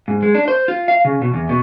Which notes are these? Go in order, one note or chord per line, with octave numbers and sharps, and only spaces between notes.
G#2
G#3
D4
C5
F4
F5
C#3
B2
E2
B2